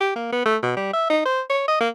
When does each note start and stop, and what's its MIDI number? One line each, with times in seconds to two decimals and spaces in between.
0.01 0.12 67
0.16 0.31 58
0.32 0.43 59
0.46 0.57 57
0.63 0.72 47
0.77 0.92 55
0.94 1.08 76
1.10 1.21 63
1.26 1.42 72
1.50 1.68 73
1.68 1.79 75
1.80 1.89 58